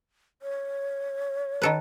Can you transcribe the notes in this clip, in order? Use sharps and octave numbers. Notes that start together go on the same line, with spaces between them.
C#5
D#3 A4 B4